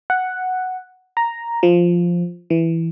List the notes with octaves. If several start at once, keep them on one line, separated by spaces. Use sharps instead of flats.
F#5
A#5
F3
E3